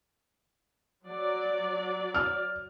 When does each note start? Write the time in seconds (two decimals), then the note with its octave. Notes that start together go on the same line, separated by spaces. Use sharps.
1.07 F#3 D5
2.14 F6